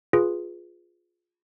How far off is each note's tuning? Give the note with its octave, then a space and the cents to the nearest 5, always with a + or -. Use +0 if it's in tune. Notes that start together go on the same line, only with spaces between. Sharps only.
F4 +10 G#4 +0 B4 +0